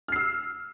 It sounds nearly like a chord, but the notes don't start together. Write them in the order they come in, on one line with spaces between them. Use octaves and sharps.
F6 C7 E6